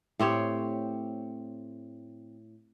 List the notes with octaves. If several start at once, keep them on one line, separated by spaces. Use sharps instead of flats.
A2 C4 G4 C#5